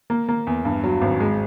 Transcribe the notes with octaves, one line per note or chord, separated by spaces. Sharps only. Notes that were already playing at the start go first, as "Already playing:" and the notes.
A#3
A#3
E2
G2
F#3
G#1
G#3